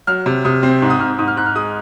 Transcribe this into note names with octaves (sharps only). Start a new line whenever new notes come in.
F#3 F6
C3
C3 D#6
C4
G#2
D#6
G#2 F6
G#2 D#6
F6
G#2 F#6
F6
G#3 D#6